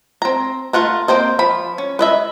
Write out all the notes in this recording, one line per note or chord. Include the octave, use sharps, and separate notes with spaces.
C4 A#5
A3 F4 F#5 A#5
A#3 C4 C5 D#5
F3 B5
C#4
B4 D#5 E5